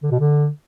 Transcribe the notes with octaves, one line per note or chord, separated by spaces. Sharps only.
D3
B2
D3